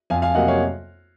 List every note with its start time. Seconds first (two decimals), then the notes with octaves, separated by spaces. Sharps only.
0.10 F2 F5 G#5
0.22 F5 G#5
0.35 C3 F#3 A#3 D#5 F#5
0.48 C#5 F5